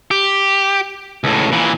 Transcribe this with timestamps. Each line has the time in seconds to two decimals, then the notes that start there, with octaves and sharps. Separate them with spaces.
0.11 G4
1.24 C#2 A2
1.52 A#2 E3